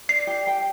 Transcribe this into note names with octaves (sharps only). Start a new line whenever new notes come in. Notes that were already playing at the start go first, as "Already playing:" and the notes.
D5 C7
G4
G5